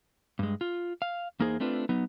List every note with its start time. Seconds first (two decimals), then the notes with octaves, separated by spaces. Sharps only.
0.39 G2 G#3
0.61 F4
1.02 F5
1.40 E2 A#3 D#4 G#4 C5
1.60 A3 C4 D4 F4 B4
1.89 F#3 B3 D#4